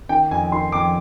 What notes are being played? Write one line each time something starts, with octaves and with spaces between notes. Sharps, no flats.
D#3 G5
F2 G#5
D#3 C6
F2 D6